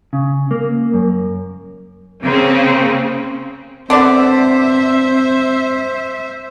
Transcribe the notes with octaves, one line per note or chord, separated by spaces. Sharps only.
C#3
A#3
F#2
C#3 A#3 C4
D3 B3 C4 C5 D5 E5